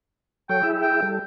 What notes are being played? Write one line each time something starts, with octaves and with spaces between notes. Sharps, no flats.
F#3 A4 C#5 G5
E4 G#4 E5
G5
G3 A4